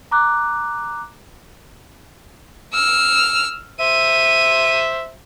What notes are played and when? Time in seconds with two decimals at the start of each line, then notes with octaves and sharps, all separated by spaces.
0.11 A#5 D6 F#6
2.73 E6 F6
3.80 C5 E5 D#7